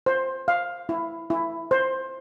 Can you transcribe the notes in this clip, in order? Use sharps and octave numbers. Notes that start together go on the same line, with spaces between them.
C5
F5
E4
E4
C5